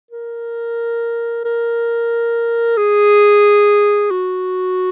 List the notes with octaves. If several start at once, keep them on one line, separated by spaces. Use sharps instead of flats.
A#4
A#4
G#4
F#4